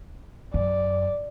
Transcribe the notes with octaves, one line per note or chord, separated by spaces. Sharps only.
F#2 D5